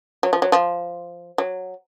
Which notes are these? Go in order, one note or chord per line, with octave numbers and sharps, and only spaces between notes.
F#3
F3
F#3
F3
F#3